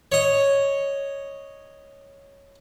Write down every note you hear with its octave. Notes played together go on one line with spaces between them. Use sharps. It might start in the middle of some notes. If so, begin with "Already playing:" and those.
C#5 D#5